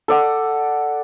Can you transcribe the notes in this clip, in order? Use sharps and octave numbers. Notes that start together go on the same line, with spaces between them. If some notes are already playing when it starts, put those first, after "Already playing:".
A4 D5 F#5